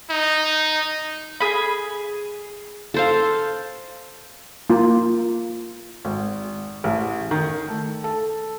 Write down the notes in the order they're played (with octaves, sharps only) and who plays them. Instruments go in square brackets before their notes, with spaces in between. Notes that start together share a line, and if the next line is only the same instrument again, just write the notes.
[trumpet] D#4
[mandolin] G#4 B5
[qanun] A4 C5 F5
[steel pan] A#3 F4
[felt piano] G#1
A1
D#3
A3
A4